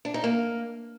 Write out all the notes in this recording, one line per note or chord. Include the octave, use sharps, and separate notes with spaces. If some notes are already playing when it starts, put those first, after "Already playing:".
D4
D#4
A#3